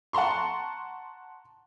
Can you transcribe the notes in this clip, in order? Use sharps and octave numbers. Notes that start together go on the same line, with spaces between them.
F#5 A5 A#5 C6 C#6